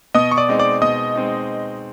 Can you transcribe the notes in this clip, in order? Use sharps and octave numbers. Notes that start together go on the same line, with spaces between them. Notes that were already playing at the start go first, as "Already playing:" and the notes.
B2 D#5 D#6
C#6
D5 D6
G#3 C4 D#4
D5 D6
B2 D#5 D#6
G#3 C4 D#4